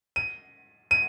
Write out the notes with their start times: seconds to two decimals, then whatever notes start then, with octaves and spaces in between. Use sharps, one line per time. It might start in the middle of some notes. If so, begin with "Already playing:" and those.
0.16 D#7
0.91 D#7